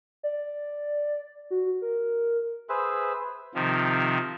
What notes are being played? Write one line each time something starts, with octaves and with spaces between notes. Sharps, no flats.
D5
F#4
A#4
G#4 B4 C5 E5
C3 D#3 F3